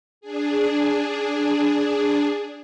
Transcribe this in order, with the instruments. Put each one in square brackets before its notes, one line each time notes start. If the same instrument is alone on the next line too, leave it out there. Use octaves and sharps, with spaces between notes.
[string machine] D4 G#4